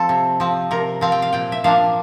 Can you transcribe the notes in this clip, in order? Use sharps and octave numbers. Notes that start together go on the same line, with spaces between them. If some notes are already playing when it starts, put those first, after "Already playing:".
Already playing: F3 C4 A4 C5
C3
F3 C4
C3 A#4
F3 C4 F5
G5
F5
A#2 G5
E5
F3 A#3 D4 F5